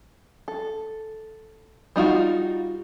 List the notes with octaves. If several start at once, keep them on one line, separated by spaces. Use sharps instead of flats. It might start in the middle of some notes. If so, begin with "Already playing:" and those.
A4
G3 D#4 F4 F#4